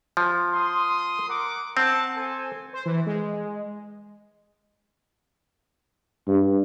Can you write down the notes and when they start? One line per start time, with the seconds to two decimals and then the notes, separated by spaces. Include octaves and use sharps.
0.17 F3
0.53 C6 D#6
1.29 A#4 F#5 D6
1.77 C4 F#5 A5
2.16 A4 C5 G#5
2.73 C5
2.86 E3
3.06 G#3
6.28 G2